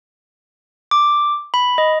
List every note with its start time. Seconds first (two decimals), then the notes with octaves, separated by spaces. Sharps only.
0.91 D6
1.54 B5
1.78 D#5